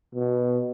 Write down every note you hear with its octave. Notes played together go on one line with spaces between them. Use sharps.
B2